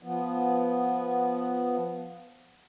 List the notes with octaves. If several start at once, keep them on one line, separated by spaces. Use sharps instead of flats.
F3 B3